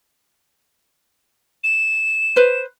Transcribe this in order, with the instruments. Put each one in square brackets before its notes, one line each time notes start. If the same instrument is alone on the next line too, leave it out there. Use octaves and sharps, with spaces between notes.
[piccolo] E7
[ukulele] B4 C5